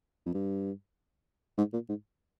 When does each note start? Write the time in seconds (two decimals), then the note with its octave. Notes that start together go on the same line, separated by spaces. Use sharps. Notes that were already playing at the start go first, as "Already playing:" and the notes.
0.26 F2
0.34 G2
1.58 G#2
1.73 A#2
1.89 G#2